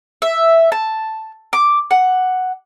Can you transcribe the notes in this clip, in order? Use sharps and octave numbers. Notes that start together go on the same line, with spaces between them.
E5
A5
D6
F#5